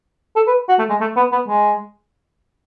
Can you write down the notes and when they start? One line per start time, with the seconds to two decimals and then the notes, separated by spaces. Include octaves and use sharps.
0.36 A4
0.47 B4
0.69 F#4
0.79 A3
0.90 G#3
1.01 A3
1.17 B3
1.32 B3
1.48 G#3